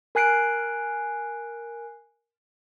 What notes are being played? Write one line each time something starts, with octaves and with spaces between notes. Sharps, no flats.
A#4 G#5 F#6 C7 D7